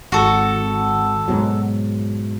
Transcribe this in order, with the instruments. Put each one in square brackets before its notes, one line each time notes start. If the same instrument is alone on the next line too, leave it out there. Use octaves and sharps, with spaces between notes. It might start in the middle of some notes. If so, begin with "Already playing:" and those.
[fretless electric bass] G#1 [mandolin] F#4 A4
[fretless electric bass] G#2 B2 F#3